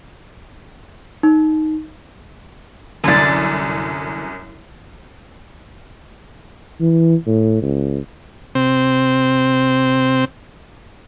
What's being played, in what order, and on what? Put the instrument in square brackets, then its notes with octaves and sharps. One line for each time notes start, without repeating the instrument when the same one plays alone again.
[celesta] D#4
[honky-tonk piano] C2 F#2 [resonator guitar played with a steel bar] D3 D5
[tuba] E3
A2
C#2
[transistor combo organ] C3 C4